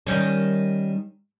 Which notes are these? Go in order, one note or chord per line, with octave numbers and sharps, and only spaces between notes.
D#3 G3 C#4